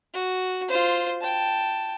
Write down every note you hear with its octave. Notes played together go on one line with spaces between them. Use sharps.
F#4
F4 C5
G5 A5